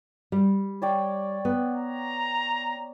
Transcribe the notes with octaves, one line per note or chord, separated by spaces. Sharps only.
G3
C#5 D5 G5
B3
A#5